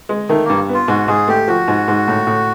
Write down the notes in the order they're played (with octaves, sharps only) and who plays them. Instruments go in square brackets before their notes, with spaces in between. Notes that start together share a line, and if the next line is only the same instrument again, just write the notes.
[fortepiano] G#3
[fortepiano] D#3 [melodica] A3
[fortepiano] G2 [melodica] A#3
[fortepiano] B3
[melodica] F4
[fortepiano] G#2 [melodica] F#4
[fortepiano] G#2 [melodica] G#4
[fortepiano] A3 [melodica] G4
[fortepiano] F3 [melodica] F#4
[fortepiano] G#2
G#2
A2
A2